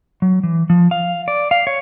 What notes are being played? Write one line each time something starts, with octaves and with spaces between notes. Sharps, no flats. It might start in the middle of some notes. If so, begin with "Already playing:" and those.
F#3
E3
F3
F5
D5
F5
C#5